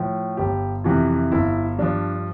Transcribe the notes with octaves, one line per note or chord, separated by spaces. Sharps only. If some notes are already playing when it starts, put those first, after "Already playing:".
Already playing: A2 F3
G1 G4
F2 C3 E3 F4
G1 E4
G2 F3 D4